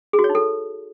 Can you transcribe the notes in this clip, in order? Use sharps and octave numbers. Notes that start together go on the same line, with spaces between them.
G#4
F#4
C#5
D#4
A4